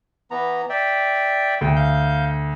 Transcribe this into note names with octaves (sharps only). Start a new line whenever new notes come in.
E3 B3 A#5
D5 E5 G5
D2 G5
F5 G6